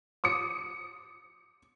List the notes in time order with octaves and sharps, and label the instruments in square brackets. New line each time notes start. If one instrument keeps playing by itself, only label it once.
[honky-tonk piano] D6 D#6 C#7